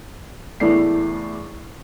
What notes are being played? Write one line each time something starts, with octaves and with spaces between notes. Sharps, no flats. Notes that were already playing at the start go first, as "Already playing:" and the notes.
E2 A2 E3 A3 D5 C7